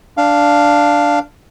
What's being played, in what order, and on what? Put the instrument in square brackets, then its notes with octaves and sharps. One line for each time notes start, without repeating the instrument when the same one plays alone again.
[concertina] D4 F5